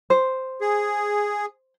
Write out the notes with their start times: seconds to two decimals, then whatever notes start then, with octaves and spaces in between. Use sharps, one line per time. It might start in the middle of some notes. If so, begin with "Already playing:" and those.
0.10 C5
0.61 G#4